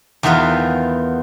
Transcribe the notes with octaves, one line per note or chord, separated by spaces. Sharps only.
E2 D#3 E3 B3 F4 A#4